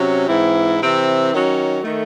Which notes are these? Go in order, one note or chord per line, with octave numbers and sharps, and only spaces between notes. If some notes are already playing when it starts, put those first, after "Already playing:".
Already playing: C3 F#3 C#4
G#2 E3 C4 E4
C3 E3 C4
D#3 F#3 C#4
D#3 A3